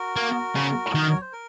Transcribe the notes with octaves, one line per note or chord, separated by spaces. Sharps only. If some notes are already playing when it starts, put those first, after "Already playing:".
Already playing: F#4 A#4
A#3
C#3
D#3 D#5
C#5
C5
A#4